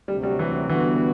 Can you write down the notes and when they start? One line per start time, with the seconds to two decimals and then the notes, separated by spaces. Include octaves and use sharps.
0.08 D2 C3 F#3 G3
0.23 G3
0.39 E3
0.69 D3 E3 G3 B3 F#4